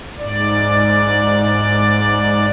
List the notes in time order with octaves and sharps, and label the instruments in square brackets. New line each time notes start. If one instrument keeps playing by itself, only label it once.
[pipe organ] G#2 D5